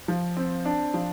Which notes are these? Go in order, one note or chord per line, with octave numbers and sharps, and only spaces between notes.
F3
C4
D4
F3